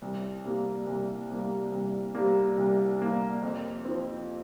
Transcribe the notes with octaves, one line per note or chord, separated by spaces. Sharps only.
C2
C3 G3 A#3
C2
C3 G3 A#3
C2
C3 G3 A#3
C2
C3 G3 A#3
F2
F3 C4